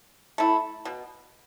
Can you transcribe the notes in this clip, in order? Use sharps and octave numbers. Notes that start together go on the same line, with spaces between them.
A3 E4
B2